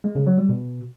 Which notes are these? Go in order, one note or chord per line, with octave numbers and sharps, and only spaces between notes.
G#3
C#3
F#3
G3
B2